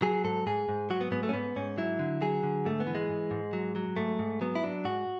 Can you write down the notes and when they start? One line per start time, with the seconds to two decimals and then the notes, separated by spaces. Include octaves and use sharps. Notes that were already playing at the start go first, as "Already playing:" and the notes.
0.02 F#3 G#4
0.24 G#2 A4
0.47 G#2 G#4
0.69 G#2
0.90 F#3 F#4
1.01 B3
1.11 G#2 B3
1.23 A3
1.29 C#4
1.33 G#2 B3
1.56 G#2 C#4
1.78 F#3 E4
1.99 D3
2.21 F#3 G#4
2.43 D3
2.65 G#2 A3
2.80 B3
2.87 E3
2.95 G#3
3.09 G#2
3.31 G#2
3.53 F#3
3.76 F#3
3.96 G#2 A3
4.19 G#2
4.41 F#3 B3
4.55 E4
4.63 F#3 D4
4.85 G#2 F#4